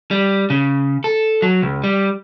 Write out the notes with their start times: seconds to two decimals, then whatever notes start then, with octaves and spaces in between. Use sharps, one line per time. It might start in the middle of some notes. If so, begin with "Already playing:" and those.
0.11 G3
0.50 C#3
1.04 A4
1.42 F#3
1.62 C#2
1.84 G3